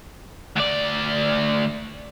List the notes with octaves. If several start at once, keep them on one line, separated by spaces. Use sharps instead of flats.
D2 D5